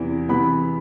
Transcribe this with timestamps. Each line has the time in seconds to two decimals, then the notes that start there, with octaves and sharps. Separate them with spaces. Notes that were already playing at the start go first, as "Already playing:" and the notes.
Already playing: E2 C3 E3
0.29 C3 E3 B3 B5